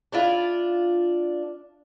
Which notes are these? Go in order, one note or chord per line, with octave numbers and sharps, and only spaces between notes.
D4 E4 F4